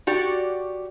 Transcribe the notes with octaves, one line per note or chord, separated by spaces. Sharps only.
F#4 G4 D5